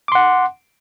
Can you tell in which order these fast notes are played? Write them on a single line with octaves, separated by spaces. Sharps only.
D6 C6 F#5